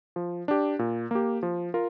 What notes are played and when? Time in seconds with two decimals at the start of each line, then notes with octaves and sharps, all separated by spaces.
0.16 F3
0.48 D4 G4
0.79 A#2
1.11 A#3 G4
1.43 F3
1.74 F4 A#4